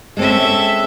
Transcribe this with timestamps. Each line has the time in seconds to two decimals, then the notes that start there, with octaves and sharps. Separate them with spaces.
0.17 G#3 C4 C#4 A4 E5